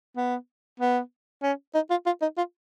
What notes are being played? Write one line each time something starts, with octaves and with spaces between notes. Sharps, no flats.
B3
B3
C#4
D#4
F4
F4
D#4
F4